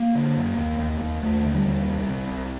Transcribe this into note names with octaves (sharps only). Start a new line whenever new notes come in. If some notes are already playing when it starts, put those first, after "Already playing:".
Already playing: A#3
D3
F#2
D#2
D#2
D#2
D#2 A3
D3
G3
D#2
C2
C3
C2